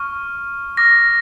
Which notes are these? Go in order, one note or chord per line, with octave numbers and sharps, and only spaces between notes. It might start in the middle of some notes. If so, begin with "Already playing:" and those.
Already playing: C#6 F6
D6 F6 A#6